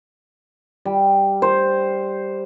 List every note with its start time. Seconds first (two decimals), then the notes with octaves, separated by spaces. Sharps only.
0.85 G3
1.42 C5